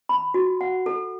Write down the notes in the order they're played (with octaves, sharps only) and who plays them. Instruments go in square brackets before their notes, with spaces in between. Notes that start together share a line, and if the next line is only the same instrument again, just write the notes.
[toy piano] B5
F#4
F#5
A4